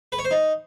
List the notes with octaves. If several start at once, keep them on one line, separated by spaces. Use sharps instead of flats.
B4
C#5
C5
D#4